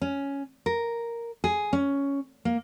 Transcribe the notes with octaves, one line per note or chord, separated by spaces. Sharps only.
C#4
A#4
G#4
C#4
A#3